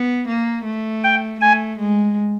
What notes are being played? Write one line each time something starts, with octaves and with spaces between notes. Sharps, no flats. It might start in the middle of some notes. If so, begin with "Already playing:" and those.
Already playing: B3
A#3
A3
G5
A3 G#5
G#3